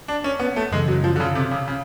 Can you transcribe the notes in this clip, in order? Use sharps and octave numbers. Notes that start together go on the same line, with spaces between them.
D4
C#4
B3
A3
F#2 C#3 E3 G#3
F#3
F3
D3
C#3
C3
C#3
C#3